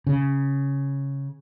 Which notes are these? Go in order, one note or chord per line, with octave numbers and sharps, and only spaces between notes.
C#3